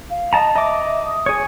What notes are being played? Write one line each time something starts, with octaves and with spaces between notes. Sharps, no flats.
F5
D#5 A5 A#5
D#5 E5 D6
D#6
G#4 C#5